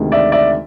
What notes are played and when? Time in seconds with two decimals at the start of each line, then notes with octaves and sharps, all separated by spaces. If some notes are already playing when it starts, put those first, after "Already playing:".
Already playing: D2 C3 D#3 G#3
0.12 D5 E5
0.32 D5 E5